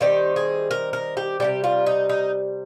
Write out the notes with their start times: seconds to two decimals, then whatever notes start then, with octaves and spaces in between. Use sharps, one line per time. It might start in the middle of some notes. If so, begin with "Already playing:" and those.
0.01 D#3 G3 C4 D#4 G4
0.36 G#4
0.71 A#4
0.93 A#4
1.17 G4
1.40 C3 D#3 G3 G4
1.64 F4
1.86 D#4
2.09 D#4